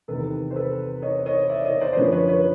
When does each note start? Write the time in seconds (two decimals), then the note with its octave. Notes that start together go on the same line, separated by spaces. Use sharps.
0.08 E2 C3 D#3 A4 B4
0.51 C5
0.56 A4 B4
1.02 C#5 D#5
1.26 C#5 D#5
1.49 D5 E5
1.65 C#5 D#5
1.81 C5 D5
1.93 C5
1.97 F#2 D3 F3 B4 C#5
2.12 B4 C#5
2.28 B4 C#5